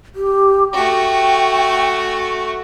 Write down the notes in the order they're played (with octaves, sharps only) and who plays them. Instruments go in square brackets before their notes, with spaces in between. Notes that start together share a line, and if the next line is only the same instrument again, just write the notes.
[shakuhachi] G4
[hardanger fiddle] A3 F#4 [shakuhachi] G5